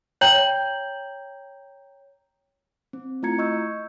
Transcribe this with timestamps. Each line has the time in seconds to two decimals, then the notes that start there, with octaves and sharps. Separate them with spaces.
0.21 C#5 G5 A#5 G6 F#7
2.93 C4
3.23 A3 E4 F4 A#5 G#6 C#7
3.38 D#5 C#6 E6 G6